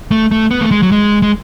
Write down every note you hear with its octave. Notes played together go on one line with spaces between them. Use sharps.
A3
A3
B3
A3
G#3
F#3
G#3
G#3